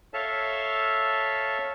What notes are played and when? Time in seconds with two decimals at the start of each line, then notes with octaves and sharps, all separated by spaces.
0.14 A4 C#5 E5 F5 A5